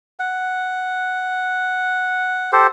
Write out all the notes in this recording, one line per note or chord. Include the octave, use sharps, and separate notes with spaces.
F#5
G4 A4 C5